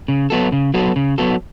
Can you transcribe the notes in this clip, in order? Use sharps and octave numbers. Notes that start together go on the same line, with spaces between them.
C#3
F#3 B3 F#4 A4
C#3
F#3 B3 F#4 A4
C#3
F#3 B3 F#4 A4